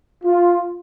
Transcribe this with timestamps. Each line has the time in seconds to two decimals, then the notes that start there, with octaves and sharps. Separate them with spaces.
0.25 F4